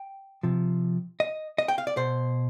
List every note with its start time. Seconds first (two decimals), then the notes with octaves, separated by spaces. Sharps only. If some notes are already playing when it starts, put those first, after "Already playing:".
Already playing: G5
0.43 C3 F3
1.20 D#5
1.58 D#5
1.68 G5
1.78 F5
1.87 D5
1.97 B2 C5